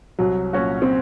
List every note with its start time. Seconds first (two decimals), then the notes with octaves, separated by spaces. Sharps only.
0.19 C2 F#3
0.53 A#2 F#3 C#4 F#4
0.82 C4